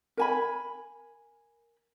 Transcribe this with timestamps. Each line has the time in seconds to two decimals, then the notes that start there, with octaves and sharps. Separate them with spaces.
0.17 A#4 G#5 B5